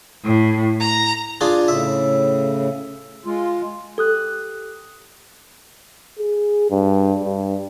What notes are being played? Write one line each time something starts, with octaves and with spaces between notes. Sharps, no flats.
A2
A#5
D4 F4 G#4
A2 C#3 E5
G#3 F4
G4 A4 D#6 F#6
G#4
G2
G2